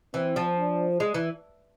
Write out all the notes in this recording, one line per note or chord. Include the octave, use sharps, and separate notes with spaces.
E3 C4
F3
D4
G#3
E3